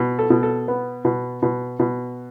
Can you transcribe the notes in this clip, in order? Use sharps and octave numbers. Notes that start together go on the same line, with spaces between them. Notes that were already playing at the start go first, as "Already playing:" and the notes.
Already playing: B2
A4
B2
A4
B3
B2
B2
B2